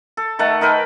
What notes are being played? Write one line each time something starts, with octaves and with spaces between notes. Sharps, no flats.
A4
D#3 A3 F#5 A5
D#4 A#4 B4 G5